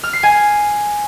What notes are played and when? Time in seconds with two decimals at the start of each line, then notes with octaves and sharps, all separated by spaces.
0.03 F6
0.13 C7
0.23 G#5